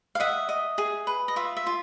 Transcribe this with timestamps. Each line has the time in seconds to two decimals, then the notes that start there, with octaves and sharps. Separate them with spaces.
0.15 F5
0.20 D#5 E5 F#5
0.49 D#5
0.78 G#4
1.07 B4
1.28 D#5
1.36 F4 E5
1.57 E5
1.66 F4